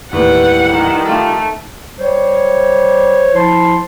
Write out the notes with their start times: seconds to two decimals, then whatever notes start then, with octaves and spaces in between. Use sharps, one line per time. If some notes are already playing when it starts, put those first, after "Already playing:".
0.13 D#2 A2 E3 G3 B4 F#5
0.69 D#3
1.06 A3 F4 G4 A4
1.99 G3 C5 C#5
3.34 F3 E4 A5 C6